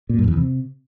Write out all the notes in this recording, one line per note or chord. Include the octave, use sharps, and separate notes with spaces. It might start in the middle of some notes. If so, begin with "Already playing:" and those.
A#2
G2
E2
C3